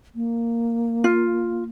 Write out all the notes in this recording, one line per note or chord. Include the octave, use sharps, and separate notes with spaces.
A#3
F4